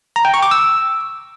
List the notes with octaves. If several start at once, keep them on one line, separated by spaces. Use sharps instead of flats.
A#5
G5
C#6
D6
E6